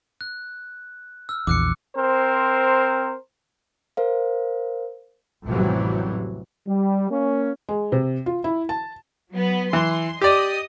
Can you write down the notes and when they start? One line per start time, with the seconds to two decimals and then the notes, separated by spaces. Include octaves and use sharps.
0.21 F#6
1.29 E6 F6
1.47 A#1 E2 D6 F#6 C#7
1.97 C4 A#4 C5
3.97 A#4 C5 F5
5.47 A1 F2 C3 E3 F#3 G3
6.67 G3
7.09 A#3 C#4
7.69 G#3
7.92 C3
8.26 F4
8.44 E4
8.69 A5
9.31 F#3 B3
9.73 E3 C6
10.21 G4 D5 D#5 D#6